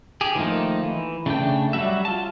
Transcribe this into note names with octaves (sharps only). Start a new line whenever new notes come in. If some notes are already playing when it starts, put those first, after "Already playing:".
G4 G#4
D#3 F3 A3 A#3 D#4
E3
C#3 A3 D4 G5
F#3 G3 F#4 E5
F4 A5